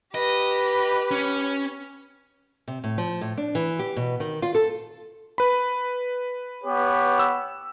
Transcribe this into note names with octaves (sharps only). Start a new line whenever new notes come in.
G4 B4 D#5
C#4
C3
A2
F3
A2
D4
E3
G4
B2
D#3
F4
A4
B4 B5
B3 G4 C#5
E6